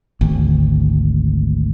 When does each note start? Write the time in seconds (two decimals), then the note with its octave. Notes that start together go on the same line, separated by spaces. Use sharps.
0.21 G#1 D2